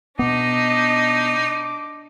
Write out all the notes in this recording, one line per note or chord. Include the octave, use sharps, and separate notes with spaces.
B2 B3 D4 D#4 D#5 D6